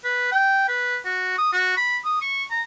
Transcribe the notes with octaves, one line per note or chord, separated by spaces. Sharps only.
B4
G5
B4
F#4
D#6
F#4
B5
D#6
C#6
A#5